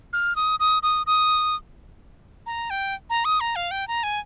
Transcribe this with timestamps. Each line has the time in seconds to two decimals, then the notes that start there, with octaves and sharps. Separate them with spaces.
0.13 F6
0.36 D#6
0.60 D#6
0.83 D#6
1.07 D#6
2.46 A#5
2.70 G5
3.10 A#5
3.25 D#6
3.40 A#5
3.56 F5
3.71 G5
3.88 A#5
4.03 G#5